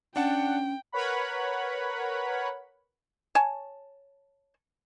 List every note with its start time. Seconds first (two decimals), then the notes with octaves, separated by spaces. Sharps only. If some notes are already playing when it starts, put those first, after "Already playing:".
0.16 C#4 D4 F#5 G5 A5
0.92 A#4 B4 C#5 F#5 B5
3.35 C#5 G#5 A5